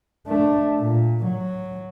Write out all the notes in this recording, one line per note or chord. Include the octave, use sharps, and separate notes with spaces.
A3 D4
A#2
F#3